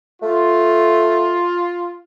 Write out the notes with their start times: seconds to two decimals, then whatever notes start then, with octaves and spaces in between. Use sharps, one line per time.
0.22 A3 F4